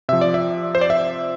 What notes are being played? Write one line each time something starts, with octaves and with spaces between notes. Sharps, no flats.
C3 F3 E5
D5
E5
C5
D5
E5